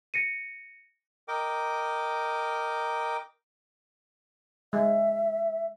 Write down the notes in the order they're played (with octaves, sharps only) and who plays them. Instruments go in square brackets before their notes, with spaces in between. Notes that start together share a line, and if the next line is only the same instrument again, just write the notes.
[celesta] A#6 C#7 D#7
[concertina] A#4 D#5 G5 D6
[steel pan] G#3 [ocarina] E5